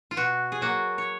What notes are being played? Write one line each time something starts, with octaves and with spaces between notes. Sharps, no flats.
F4
B2 F#4
G#4
F#3 A#3 F#4
C#5